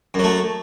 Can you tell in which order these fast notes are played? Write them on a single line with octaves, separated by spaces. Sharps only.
F#2 F#3 A3